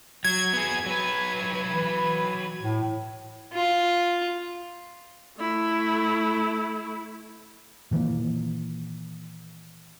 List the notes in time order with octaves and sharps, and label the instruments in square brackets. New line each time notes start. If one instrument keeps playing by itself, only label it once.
[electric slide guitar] F#3 [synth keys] G#6
[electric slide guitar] B3 G#4
F#3 B4
[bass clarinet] E3
A2
[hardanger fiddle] F4
[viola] A3 E4
[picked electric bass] A#2 D#3 E3 A#3